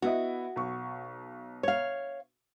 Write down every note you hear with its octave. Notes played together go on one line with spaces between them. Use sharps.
B3 E4 F#4 D#5
B1 C#6
C#5 F5